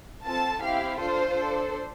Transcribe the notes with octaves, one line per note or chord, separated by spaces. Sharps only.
C4 F4 A4 A5
C4 E4 G4 F5
D4 F4 A4 C5
D4 A4